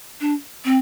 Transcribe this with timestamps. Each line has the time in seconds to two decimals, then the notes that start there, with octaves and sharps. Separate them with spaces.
0.21 D4
0.65 C4